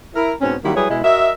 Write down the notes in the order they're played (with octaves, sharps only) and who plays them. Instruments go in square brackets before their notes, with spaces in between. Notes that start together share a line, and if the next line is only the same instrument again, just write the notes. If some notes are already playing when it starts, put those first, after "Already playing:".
[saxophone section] E4 A#4
G#2 B2 C4 C#4
D#3 F#3 G3 A#3 E4
F#3 G3 E4 G#4 B4 C#5
B2 G#3 E4
F#4 A#4 D#5 E5